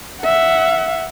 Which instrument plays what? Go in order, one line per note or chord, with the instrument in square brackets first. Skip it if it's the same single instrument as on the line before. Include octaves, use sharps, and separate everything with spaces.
[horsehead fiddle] E5 F#5